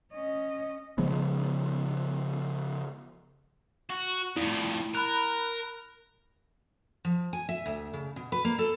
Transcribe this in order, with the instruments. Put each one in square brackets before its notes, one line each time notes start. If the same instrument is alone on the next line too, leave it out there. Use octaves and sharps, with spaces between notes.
[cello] C#4 D#5
[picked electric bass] C#3 F3 G#3 B3
[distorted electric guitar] F#4
[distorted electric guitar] F2 A2 [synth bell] E4
[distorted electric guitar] A#4 [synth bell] B5 F#6
[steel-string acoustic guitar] F3
G#5
E5
D2
C#3
B2
B4
A#3
A4